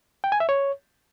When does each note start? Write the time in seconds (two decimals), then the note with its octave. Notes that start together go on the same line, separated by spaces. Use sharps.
0.24 G5
0.32 G#5
0.40 E5
0.49 C#5